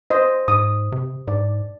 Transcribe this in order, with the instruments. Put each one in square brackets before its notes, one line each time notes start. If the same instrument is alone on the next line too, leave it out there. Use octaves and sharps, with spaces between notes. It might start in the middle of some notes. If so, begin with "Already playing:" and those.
[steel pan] C5 D#5
[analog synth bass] G#2 [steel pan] D#6
[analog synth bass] C3
[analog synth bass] G#2 [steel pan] D5